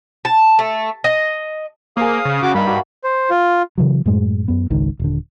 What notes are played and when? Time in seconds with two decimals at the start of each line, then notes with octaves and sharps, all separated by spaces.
0.25 A5
0.59 A3
1.04 D#5
1.97 A#3 G#4 C5 F5 D#6
2.25 C#3
2.43 C#3 F#4 D6
2.55 G2 G3 A#3 D#4 B5 E6
2.67 F#4 E5 A5
3.04 C5
3.30 F4
3.78 C#3 E3 F#3
4.06 F#2 A2 G#3
4.48 F#2 B3
4.70 G#1 C#2 G#2 D#3
4.99 D#1 D3